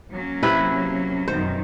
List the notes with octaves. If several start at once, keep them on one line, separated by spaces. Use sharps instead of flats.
F#3 A#3 C#4
C3 E4 B4
F#2 B2 D#3 C5